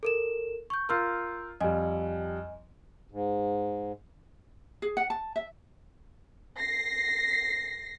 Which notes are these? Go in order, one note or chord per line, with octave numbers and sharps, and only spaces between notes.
A4 A#4 E7
C#6 G6
F4 A#4 C6 E6 G6
F2 G3 D#5 G#5
G#2
G#4
F#5
A5
E5
A#6 C7